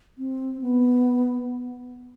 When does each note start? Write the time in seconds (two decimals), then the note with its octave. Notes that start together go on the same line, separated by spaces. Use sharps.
0.18 C4
0.62 B3